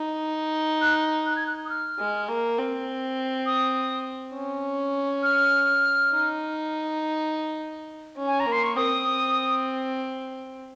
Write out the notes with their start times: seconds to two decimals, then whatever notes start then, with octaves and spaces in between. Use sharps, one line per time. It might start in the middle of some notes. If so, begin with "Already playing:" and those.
Already playing: D#4
0.81 F#6
1.26 F#6
1.36 G#6
1.47 F#6
1.65 D#6
1.70 F6
1.99 G#3
2.28 A#3
2.58 C4
3.46 D#6
4.34 C#4
5.23 F6
6.11 D#4
8.17 C#4
8.27 G#5
8.40 A#5
8.46 A#3
8.52 C6
8.64 C#6
8.75 C4 D#6